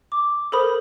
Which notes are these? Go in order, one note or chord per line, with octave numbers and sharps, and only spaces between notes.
D6
A4 A#4 C5 B5 D#6